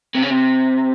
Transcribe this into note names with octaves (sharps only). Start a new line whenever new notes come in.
C3
C#3
C3